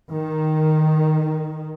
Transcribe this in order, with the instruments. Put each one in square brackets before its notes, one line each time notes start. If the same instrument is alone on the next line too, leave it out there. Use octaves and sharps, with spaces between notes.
[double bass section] D#3